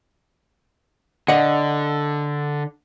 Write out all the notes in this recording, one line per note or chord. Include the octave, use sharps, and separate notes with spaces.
D3 D5 D#5 F#5